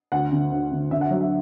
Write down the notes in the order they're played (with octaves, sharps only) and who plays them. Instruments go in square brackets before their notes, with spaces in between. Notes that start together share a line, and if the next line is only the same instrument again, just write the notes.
[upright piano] D2 F#5
D3
D2
D3
D3 E5
F#5
F#3 E5
E5